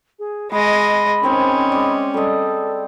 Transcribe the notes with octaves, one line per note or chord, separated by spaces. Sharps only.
G#4
G#3 G#4 D#5 B5
D#3 C4 C#4 G#4
G#3 D5
G3 A4 D#5